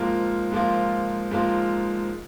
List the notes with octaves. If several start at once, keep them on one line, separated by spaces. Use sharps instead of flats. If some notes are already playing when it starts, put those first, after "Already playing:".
Already playing: G#2 F3 A#3 F4
G#2 F3 A#3 F4
G#2 F3 A#3 F4